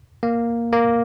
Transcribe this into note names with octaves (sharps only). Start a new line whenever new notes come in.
A#3
A#3